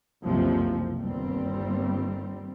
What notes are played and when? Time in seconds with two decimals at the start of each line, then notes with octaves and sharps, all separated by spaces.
0.25 F#1 C2 F2 C3 F3
0.99 G1 D#2 G3 C4